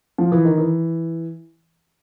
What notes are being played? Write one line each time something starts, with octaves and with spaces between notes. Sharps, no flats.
F3
E3
D#3
E3